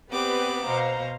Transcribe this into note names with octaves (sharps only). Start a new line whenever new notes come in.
B3 C4 G4 B4 D5 D6
B2 C5 F5 A#5